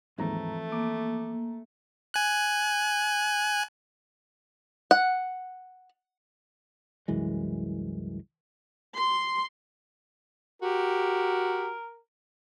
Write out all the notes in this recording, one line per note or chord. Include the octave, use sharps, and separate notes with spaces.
D#2 G#2 E3 F3 A3 C4 A#5
A#3 D6
G#5 F#6
F#5
C2 F#2 E3 G#3
C6
F#4 G4 A#4